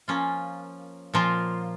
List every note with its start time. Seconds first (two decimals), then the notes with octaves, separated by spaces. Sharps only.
0.08 F3 A#3 C#4 F4
1.14 A#2 F3 A#3 F4